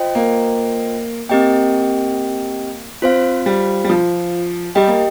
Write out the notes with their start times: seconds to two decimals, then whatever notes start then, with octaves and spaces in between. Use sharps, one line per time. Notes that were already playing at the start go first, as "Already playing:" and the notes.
Already playing: F4 C5 D#5 G5
0.15 A#3
1.29 A#3 C4 G4 D#5 G5
3.02 C4 F4 C5 F5
3.46 G3
3.84 G3
3.90 F3
4.75 G3 G4 D#5 G5
4.87 A#3